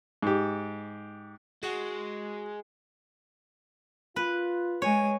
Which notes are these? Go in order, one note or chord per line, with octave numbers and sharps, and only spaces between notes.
G#2 G4
G#3 F#4
F4 B4
G#3 C#5 G#5